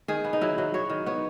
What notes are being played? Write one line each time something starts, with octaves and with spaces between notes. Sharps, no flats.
D#3 G#4
B3
D#4
F#3 E4
F#3
F#3 C#5
D#3
B3 C#5